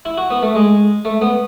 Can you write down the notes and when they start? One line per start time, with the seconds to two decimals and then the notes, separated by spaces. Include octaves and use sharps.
0.05 E4
0.17 F#4
0.30 B3
0.42 A3
0.55 G#3
1.05 A3
1.21 B3